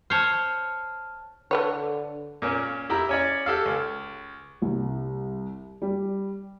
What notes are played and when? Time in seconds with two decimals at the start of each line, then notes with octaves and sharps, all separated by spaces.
0.10 C5 C#5 A5 F6
1.51 D3 A4 B4 C#5
2.42 A#2 A#3 C#4
2.90 E4 G4 E5 A#5
3.09 C#4 C#5 D5
3.46 G4 A4 F5
3.66 C#2
4.62 C2
5.82 G3